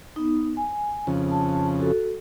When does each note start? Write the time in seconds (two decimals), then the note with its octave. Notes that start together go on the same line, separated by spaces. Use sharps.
0.16 B3 D#4
0.57 G#5
1.07 F2 C#3
1.31 A5
1.81 F#4 A4